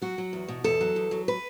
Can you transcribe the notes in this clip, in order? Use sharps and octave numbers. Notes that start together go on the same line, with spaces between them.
F#3 F#4
F#3
E2
B2
E2 A4
F#3
E2
F#3
B4